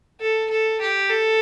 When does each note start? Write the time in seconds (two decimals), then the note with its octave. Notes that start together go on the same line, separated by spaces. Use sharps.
0.21 A4
0.50 A4
0.81 G4
1.10 A4